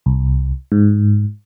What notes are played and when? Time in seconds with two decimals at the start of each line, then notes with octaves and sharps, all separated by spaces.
0.06 C2
0.72 G#2